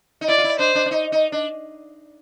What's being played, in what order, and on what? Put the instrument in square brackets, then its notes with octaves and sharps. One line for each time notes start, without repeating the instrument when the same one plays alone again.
[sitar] D#4
[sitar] E4 [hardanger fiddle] D5
[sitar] F4
E4
[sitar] D4 [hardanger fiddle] C5
[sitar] D4
D4
D#4
D#4
D4